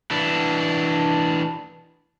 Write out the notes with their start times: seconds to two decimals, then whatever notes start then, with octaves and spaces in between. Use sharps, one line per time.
0.11 E3 D4